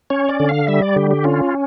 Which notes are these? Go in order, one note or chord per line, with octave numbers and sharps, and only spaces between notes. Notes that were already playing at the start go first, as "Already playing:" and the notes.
C#4 C#5
D5
D3
F5
G3 E5
D5
D3 G4
G4
C#4 F4